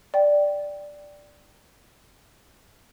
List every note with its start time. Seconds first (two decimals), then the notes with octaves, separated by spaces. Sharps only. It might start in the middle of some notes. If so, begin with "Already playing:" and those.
0.14 D5 G5